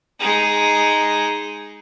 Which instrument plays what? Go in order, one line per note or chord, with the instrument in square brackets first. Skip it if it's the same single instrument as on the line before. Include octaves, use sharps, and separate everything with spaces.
[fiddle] G#3 D#4